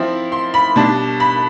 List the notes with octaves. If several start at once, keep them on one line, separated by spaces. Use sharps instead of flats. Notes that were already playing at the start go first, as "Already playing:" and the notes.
Already playing: F3 C4 E4
C6
B5
B2 G3 D4 A5
B5